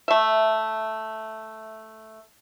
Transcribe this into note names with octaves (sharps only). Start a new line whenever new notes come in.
A3 E5